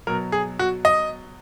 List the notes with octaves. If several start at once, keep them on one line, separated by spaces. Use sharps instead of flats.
B2 F#3 A#4
G#4
F#4
D#5